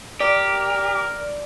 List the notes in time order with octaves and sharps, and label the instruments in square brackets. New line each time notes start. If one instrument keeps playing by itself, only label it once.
[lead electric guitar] G4 [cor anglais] A#4 [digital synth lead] D5